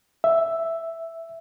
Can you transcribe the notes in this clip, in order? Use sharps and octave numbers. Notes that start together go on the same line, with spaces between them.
E5